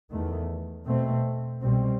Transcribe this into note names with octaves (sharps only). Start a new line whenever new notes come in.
E2 D#3 A3
B2 A3 C4
C2 B2 G3 C4